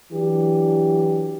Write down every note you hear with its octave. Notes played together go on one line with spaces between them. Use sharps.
E3 F#3 D4 G4